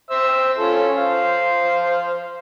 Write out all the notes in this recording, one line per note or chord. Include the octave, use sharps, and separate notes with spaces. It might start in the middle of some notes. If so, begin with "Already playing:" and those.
C5 E5 E6
C#4 F4 A4
C5 F5